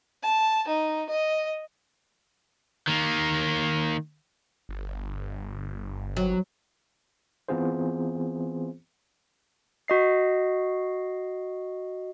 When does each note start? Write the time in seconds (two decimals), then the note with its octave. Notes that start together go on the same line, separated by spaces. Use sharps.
0.23 A5
0.67 D#4
1.09 D#5
2.87 D#3 A#3
4.69 G1
6.17 F#3
7.49 E3 B3 C4 F4 G#4 C5
9.88 F#4 D#5 C7